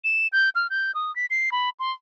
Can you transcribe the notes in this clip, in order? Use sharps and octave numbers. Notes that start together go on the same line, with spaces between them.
E7
G6
F6
G6
D#6
B6
C7
B5
C6